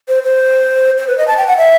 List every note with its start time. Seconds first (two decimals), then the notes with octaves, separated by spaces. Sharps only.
0.08 C5
0.23 C5
0.98 C5
1.08 B4
1.18 D#5
1.27 A5
1.37 G5
1.47 F#5
1.57 E5